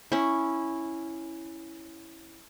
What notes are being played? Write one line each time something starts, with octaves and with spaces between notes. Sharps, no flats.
C#4 E4